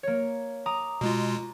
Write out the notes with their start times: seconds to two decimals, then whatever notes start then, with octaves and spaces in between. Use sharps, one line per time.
0.03 A#3 C#5
0.66 A#5 D6 D#6
1.01 B2 G#3 F4